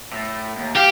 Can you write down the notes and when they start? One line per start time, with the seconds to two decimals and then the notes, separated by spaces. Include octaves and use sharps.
0.13 A2
0.57 D#2
0.76 G4 F5